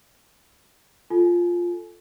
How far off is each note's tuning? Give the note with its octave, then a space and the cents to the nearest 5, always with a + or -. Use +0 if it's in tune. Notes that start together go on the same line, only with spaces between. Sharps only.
F4 +0 A4 +0 G#5 +30